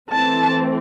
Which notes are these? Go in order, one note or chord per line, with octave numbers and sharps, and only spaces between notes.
E3 A3 C4 A5